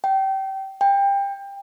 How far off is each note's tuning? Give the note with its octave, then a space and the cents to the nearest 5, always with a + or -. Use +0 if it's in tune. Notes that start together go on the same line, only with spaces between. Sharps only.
G5 -25
G5 +25